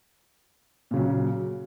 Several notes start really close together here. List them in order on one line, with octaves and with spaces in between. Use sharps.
A#2 C#3 F#3